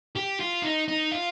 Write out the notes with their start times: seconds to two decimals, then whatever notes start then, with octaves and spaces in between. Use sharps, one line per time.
0.16 G4
0.40 F4
0.63 D#4
0.88 D#4
1.11 F4